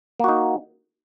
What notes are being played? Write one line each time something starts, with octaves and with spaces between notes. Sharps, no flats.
A#3 D#4 F#4